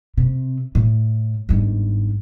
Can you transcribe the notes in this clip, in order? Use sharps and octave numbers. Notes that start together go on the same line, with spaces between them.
C3
A2
G1 G#2